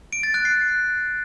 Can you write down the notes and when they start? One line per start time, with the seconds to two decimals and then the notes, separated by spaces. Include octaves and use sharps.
0.13 D7
0.23 A6
0.34 F#6
0.45 C7